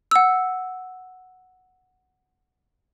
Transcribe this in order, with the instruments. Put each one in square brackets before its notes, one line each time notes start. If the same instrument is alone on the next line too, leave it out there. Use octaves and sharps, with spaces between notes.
[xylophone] F#5 E6